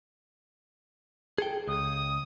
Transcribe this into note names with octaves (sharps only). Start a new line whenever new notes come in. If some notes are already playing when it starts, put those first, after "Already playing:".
G#4 A4 G5
C#2 D#6